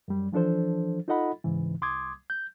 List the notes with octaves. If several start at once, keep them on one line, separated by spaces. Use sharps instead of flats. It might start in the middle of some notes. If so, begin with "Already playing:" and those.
F#2 G3
E3 F3 D4 A4 C5
D#4 F4 A4 D#5 F#5 B5
G#2 C#3 E3
C2 C6 D6 D#6 G#6
G6